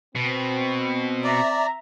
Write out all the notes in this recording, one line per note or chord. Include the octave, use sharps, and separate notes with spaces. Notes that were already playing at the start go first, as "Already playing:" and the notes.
B2 C4
D5 E5 A#5